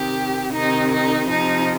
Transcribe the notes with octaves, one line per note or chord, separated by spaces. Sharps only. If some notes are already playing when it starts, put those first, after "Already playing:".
Already playing: C3 D#3 G4
C3 D#3 D#4
D#4
C3 F3 D#4